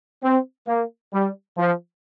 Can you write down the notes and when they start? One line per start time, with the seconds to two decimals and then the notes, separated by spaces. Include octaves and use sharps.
0.22 C4
0.67 A#3
1.13 G3
1.57 F3